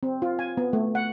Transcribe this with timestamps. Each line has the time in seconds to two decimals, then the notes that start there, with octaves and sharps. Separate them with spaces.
0.03 C4
0.22 F4
0.39 G#5
0.57 B3
0.73 A3
0.95 F#5